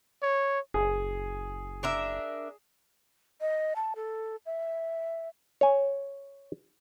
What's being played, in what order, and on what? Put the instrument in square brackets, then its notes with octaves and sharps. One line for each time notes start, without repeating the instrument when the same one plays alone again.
[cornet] C#5
[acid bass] F#1 [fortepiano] G#4
[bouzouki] D4 A#4 E5
[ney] D#5
A5
A4
E5
[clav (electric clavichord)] C#5 G#5